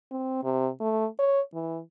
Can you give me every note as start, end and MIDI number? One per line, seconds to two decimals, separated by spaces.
0.11 0.43 60
0.44 0.68 48
0.80 1.06 57
1.19 1.41 73
1.54 1.80 52